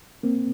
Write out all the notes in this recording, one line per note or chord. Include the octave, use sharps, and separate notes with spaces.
A#3 C4